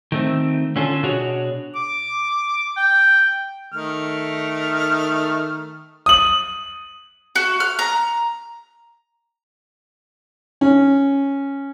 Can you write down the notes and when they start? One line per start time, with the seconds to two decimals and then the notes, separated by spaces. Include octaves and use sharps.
0.12 D#3 A3 C4
0.76 D3 C#4 F4 A4
1.03 B2 D4 F#4 G#4 C#5
1.75 D6
2.77 G5
3.72 D#3 A3 F6
6.06 D#6 F#7
7.36 F#4
7.60 F6
7.79 A#5
10.61 C#4